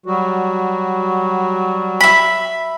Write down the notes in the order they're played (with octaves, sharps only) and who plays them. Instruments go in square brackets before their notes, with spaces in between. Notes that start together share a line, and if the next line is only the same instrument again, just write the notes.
[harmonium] F#3 G3 F#4
[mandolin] E5 B5